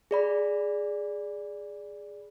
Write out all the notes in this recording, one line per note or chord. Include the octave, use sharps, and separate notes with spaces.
G#4 D5 B5